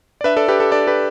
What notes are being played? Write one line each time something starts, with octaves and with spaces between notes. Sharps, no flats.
D5
D4 B4 E5
A4 D5
D4 G4 B4
A4
D4 A4 D5
G4 B4